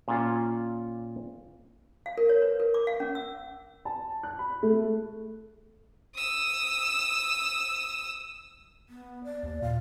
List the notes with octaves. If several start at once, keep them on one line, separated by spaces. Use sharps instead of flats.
A#2 C#4 F4 C#5
F5
A#4
C#5
B4
A#4
D6
F5
C#4
E6
A5
F#6
B5
A3
D#6 E6
B3
D5
D#2
A#2 F5